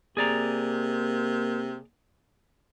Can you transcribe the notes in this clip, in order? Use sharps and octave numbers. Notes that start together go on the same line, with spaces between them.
C3 A#3 G#4 D5 A#5